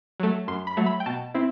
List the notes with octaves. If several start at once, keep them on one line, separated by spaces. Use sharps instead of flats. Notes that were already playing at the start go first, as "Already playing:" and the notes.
F#3 A3
F#2 C6
B5
F#3 A3
B5
G5
B2 A5
C4 E4